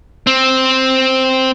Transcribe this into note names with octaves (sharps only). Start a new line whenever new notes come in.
C4